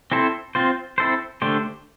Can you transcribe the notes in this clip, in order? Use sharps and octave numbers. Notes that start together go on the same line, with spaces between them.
C4 E4 A4 C5
C4 F4 C5
C4 E4 A4 C5
D3 A3 D4 G4 C5